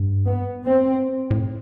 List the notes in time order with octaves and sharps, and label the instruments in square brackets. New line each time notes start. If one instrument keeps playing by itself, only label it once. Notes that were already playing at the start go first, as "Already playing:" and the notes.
Already playing: [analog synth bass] G2
[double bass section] B3
C4
[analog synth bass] A2